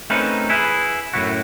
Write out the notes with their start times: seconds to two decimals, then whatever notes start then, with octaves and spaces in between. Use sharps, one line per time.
0.10 A3 C4 C#4 D#4 A#4 B4
0.50 E4 G#4 B4
1.13 F#2 A2 E3 E4 F#4